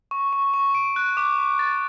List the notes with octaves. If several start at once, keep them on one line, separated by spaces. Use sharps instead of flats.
C#6
C#6
C#6
D7
F#6
D6
D6
A6